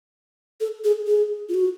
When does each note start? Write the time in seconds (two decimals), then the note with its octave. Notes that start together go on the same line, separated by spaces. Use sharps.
0.60 A4
0.84 G#4
1.07 G#4
1.49 F4
1.54 F#4